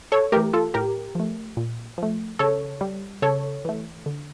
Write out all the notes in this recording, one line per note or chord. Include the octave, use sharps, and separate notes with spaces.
A4 C#5
E3 A3 G4 A#4
F4 A4
A2 G4 A#4
F3 A3
A#2
F3 A3
C#3 A4 C#5
G3
C#3 A4 C#5
E3 A3
D3